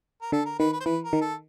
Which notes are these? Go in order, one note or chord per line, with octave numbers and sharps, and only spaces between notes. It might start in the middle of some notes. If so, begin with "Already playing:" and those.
A#4
D3 A4
A#4
D#3 B4
B4
C5
E3 B4
A#4
D#3
A4